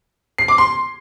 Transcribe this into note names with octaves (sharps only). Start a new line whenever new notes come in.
C7
D6
C6